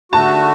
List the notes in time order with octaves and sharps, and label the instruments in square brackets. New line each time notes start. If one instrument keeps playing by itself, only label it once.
[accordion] D3 A3 F#4 [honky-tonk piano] A5